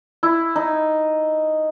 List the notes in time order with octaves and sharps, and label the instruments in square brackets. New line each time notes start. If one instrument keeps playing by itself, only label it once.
[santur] E4
D#4